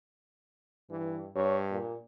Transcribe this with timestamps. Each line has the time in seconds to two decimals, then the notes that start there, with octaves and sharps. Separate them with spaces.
0.90 G2 E3
1.36 G2 C#5
1.71 A#2